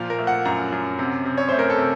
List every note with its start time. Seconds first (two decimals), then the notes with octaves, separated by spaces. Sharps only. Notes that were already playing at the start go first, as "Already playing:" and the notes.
Already playing: A#2 F3 F5
0.10 A#4
0.18 A3
0.27 F#5
0.45 F#2 A#5
0.72 F#2
0.99 C3
1.25 C3
1.38 C#5
1.49 A3 C5
1.59 A#4
1.70 A4
1.78 C3